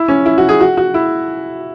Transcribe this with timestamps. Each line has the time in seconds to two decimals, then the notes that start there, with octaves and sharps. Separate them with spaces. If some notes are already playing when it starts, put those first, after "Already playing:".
Already playing: E4
0.08 C#4
0.26 E4
0.38 F#4
0.49 G#4
0.61 F#4
0.77 F#4
0.94 E4